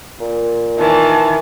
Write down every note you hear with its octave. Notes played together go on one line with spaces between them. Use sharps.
A#2
D#3 E3 A5